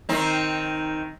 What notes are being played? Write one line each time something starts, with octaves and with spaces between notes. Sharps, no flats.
D#3 C4 D#4